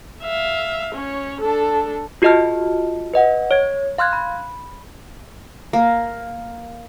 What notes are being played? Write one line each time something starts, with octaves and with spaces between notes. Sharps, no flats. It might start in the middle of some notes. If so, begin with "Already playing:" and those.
E5 F5
C#4 C#5
D4 A4
F4 F#4 G#4 D#5 A5 F6
B4 D#5 F#5
C#5 G#6
F5 C6 F6 F#6 G#6
B5
A#3